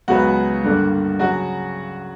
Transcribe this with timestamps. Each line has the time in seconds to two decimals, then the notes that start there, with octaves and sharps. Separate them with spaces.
0.08 C#2 C#3 F#3 B3 F#4 F#5
0.64 G2 D3 A#3
1.19 C#3 F#3 F#4 F#5